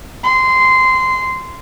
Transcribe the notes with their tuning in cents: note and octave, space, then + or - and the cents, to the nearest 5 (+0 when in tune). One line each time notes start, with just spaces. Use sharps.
C6 -15